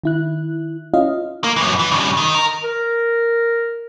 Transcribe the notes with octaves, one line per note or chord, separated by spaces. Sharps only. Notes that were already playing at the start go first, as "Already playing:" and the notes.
D#3 E4 F#6
C#4 E4 F4 D#5 F5
A#3
F#2 E3
E3
G2 C#3
D#3
A#4
A#4